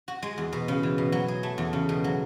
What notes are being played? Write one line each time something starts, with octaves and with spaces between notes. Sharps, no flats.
F#4
G#3
E2
B2
C#3
E3
B2
F#3
G#4
A3
E2
C#3
B2
F#3